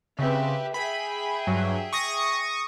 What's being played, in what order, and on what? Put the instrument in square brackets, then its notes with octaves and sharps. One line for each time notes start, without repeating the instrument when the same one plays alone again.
[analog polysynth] C#3 C4 [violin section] G4 B4 E5
[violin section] G#4 E5 G5 [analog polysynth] B5
[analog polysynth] G2 F#3
C#6 D#6 A#6